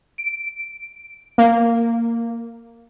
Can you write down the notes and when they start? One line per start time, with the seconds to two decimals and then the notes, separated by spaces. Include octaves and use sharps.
0.18 D7
1.38 A#3